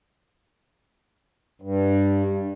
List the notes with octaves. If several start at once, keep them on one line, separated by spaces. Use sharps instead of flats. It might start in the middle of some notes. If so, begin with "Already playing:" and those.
G2